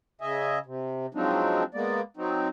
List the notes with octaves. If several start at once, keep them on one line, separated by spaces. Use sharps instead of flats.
C#3 D#5 E5 G#5
C3
F3 F#3 G#3 C4 D4 D#4
G#3 A#3 B3 D5
F#3 C4 D#4